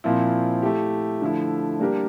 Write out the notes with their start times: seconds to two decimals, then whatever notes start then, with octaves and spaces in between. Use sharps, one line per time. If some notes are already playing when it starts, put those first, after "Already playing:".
0.04 A#2 F3 C4 E4
0.62 A3 E4 G4
1.21 D3 F3 A3 E4
1.80 G3 A#3 D4 G4 A#4